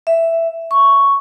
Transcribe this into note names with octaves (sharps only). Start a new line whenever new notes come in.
E5
C#6